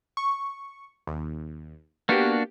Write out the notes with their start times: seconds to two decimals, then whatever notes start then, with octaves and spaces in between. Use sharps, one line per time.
0.17 C#6
1.07 D#2
2.09 A#3 B3 D4 F#4 G4